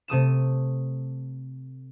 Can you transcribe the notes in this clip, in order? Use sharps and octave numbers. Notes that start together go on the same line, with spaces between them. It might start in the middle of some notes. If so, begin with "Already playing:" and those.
C3 A3 D#6 E7